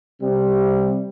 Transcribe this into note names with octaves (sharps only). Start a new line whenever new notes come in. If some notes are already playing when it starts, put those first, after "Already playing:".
C3 G3